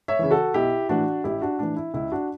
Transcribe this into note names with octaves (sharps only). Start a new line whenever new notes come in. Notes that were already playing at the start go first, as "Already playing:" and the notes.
C#5 E5
C#3 E3
F#4 A4
B1 E4 G4
A2 E3 D4 F#4
A1 E4 G4
D4 F#4
A2 E3 D4
E4
C#2 E4
D4 F#4